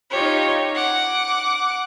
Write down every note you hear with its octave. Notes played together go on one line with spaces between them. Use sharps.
D#4 F4 G4 C#5
F#5 D6